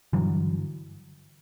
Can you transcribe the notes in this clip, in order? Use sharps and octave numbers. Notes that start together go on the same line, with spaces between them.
G2 D3 E3 F#3